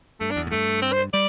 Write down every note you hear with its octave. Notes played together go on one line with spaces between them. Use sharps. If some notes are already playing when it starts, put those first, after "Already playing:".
G2 A3
D4
E2
A2
G2 A3
C4
C5
G3 D5